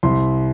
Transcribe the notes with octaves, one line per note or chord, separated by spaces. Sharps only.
C2 C6